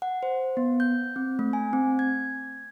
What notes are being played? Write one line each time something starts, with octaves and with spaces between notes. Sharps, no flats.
F#5
C5
B3
G6
C4
A3
G#5
C4
G#6